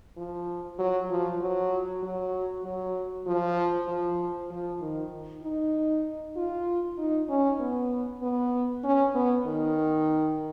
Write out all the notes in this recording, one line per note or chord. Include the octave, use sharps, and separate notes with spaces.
F3
F#3
F3
F#3
F#3
F#3
F3
F3
F3
D#3
D#4
F4
D#4
C#4
B3
B3
C#4
B3
D#3